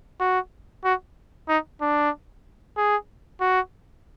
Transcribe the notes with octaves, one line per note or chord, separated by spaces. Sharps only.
F#4
F#4
D#4
D4
G#4
F#4